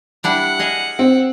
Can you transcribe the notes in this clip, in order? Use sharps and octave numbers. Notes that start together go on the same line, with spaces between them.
G3 D4 E4 F#5
G#4 D#5 F5
C4